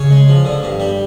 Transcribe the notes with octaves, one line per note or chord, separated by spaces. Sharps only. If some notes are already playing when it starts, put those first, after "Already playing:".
Already playing: C#3 C#5
G#3
F3
D3
G2
G3